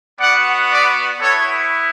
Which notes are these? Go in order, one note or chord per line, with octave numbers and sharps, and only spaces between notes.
B3 F#4 D5 F#5
B4 D5
B3 E4 A4 C#5